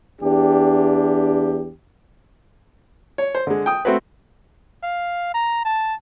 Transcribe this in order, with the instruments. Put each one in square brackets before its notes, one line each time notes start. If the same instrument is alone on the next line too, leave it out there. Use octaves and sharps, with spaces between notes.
[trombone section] E2 D4 G4
[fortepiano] C#5
C5
D3 G#3
G5 D#6
A3 C4 F#4 B4
[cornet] F5
A#5
A5